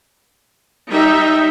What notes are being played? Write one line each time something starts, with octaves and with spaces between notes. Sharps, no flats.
G3 D#4 E5